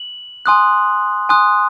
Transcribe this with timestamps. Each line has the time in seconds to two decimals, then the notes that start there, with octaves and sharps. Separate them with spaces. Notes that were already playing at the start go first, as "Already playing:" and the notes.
Already playing: F#7
0.46 G#5 C6 D#6 F#6
1.29 G#5 C6 D#6 F#6